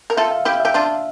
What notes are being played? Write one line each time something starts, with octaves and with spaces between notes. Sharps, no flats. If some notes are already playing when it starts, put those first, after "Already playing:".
A#4
F4 A4 E5
F5
E4 G4 F5
G4 E5
D4 F4